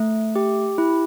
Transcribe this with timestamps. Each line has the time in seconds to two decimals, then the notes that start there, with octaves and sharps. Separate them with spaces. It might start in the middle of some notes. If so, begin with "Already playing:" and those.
Already playing: A3
0.36 G4
0.78 E4